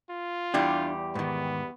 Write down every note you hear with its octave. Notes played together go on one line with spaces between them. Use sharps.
F4
E2 G3 D4 E4 G4
G#2 D#3 B3